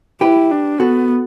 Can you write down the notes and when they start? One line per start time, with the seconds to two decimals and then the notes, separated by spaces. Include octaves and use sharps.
0.21 E4 G4 B4
0.51 D4
0.80 B3 F#4 A4